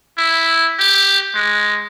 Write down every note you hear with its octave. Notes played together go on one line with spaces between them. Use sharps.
E4
G4
G#3